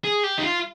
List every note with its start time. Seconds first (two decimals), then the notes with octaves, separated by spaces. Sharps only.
0.04 G#4
0.24 G4
0.38 D#4
0.43 F4